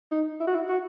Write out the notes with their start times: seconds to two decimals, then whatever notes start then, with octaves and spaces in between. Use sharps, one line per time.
0.12 D#4
0.41 E4
0.47 F#4
0.55 E4
0.69 F#4